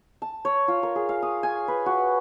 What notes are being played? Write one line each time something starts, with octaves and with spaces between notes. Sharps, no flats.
A5
C#5
F4
A#4
G#4
F5
D#6
G#5
B4
F#4